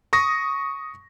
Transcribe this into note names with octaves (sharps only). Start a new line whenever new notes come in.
C#6 D#6 A#6